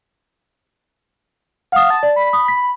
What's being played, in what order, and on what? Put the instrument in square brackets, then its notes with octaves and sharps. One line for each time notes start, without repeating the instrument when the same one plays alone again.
[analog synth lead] F5 [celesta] F#5 D#6
[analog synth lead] A5
[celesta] D5
[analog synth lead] B5
[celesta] D#6
B6